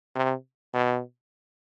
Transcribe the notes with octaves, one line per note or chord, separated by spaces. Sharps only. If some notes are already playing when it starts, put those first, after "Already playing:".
C3
B2